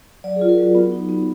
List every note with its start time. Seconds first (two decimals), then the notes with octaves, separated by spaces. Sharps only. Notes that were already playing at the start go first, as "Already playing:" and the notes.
0.24 F#3 D5
0.36 G#4
0.41 F4
0.49 A#4
0.58 F#3 F#4
0.75 B3
0.92 D#4
1.09 B3